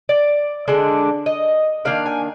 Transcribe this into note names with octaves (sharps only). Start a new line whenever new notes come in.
D5
D3 G#3 D4
D#5
D#3 A#3 D4 F5
G#5